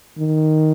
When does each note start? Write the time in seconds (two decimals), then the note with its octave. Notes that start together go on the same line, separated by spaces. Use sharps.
0.18 D#3